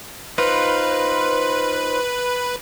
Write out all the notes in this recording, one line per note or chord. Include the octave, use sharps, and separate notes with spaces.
D#4 F4 B4 C5